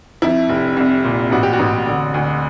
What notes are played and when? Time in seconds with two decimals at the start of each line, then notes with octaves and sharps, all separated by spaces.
0.22 F2 E4
0.49 F1
0.77 C2
1.04 A#2
1.31 A1 F#4
1.43 G4
1.53 F#4
1.59 A1
1.87 D3
2.14 D2